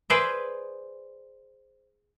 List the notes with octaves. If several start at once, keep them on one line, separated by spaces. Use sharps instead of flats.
G#4 B4 C5 D5 E5